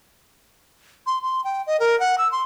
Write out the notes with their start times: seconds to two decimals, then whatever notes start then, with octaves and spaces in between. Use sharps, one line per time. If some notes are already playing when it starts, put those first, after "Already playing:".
1.06 C6
1.23 C6
1.44 G5
1.66 D#5
1.80 A#4
2.00 F#5
2.18 E6
2.32 C6